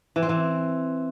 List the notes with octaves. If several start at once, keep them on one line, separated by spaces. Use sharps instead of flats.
E3
C4
E3